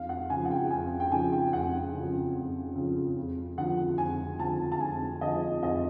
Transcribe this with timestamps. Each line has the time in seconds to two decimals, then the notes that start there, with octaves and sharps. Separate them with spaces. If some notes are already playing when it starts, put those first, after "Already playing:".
Already playing: F2 F5
0.09 F#5
0.30 C#3 F3 G#5
0.45 F#5
0.51 G5
0.71 F2 G#5
1.00 G5
1.12 C#3 F3 G#5
1.33 G5
1.53 F2 F#5
1.94 C#3
1.99 F3
2.35 F2
2.76 C#3 F3
3.16 F2
3.58 D3 F3 F#5
3.98 F2 G#5
4.39 D3 F3 A5
4.72 A5
4.80 F2 G#5
5.21 D3 F3 D#5
5.63 F2 D#5